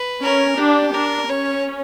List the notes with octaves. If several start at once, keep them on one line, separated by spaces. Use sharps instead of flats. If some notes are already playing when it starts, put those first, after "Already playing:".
Already playing: B4
C#4 A#4
D4 G4
D4 A#4
C#4 C#5